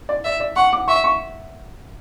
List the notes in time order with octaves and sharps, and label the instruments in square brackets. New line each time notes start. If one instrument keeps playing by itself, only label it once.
[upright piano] D5
[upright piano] D5 [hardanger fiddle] E5
[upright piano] D5
[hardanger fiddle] F#5 [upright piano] C#6
[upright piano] D6
[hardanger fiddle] E5 [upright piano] C#6
[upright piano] C#6